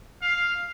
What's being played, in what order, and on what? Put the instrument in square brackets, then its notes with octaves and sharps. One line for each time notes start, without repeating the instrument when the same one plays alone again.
[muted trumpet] F5